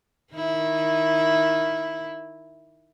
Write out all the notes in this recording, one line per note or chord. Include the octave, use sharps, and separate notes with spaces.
D#3 E4